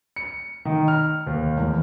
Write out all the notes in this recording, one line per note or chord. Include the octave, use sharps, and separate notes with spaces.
C#7
D#3
F6
D#2
E2